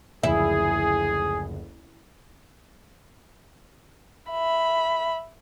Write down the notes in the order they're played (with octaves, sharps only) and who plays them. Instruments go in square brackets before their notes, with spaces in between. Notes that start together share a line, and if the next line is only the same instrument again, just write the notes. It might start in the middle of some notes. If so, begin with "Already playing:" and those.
[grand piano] F#1 D2 F3 [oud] E4 [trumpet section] G#4
[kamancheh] E5 B5